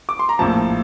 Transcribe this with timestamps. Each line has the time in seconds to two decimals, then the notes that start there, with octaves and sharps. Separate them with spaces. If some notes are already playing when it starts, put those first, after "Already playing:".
0.09 D6
0.19 C6
0.29 A#5
0.39 A#1 A2 F3 A5